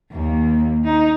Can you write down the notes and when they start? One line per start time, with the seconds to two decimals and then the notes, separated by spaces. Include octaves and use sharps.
0.13 D#2 A#3
0.84 D#4